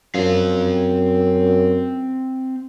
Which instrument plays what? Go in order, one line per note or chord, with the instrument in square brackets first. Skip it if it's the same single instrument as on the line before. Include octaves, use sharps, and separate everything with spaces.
[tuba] F#2 [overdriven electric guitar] C4 F5